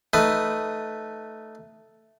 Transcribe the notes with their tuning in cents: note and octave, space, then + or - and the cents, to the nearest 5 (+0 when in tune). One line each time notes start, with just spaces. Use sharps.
A3 +0 D#4 +0 B4 +0